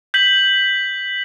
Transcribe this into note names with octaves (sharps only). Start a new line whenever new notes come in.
G6 B6 F#7